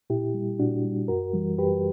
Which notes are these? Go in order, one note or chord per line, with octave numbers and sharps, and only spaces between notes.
A#2 E4 G4
G3
A#2 D4 F#4
G3
F#2 F#4 A#4
E3 G3
F#2 G4 B4